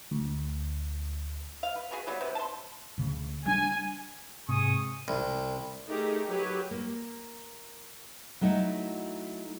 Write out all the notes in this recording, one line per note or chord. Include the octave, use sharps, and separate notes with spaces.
D2
F5
B4
B3 F#4 G#4
F#3 G3 B3
C3 B4
A5 C6
D2 C#3
G3 D4 G#5
G#2 C3 G#4 C#6 D#6
C2
A3 D#4 G4 G#4 A#4
F#3 G4 B4 C#5
A#3
F#3 A3 D#4 E4 F#4